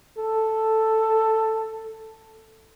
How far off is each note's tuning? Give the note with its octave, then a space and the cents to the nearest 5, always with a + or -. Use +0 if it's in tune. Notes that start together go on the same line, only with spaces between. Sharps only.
A4 +5